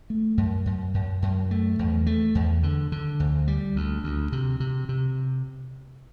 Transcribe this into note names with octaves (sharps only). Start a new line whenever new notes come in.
A3
F#2
F#2
F#2
F#2
A3
E2
A3
E2
D3
D3
D2
G3
D2
D2
C3
C3
C3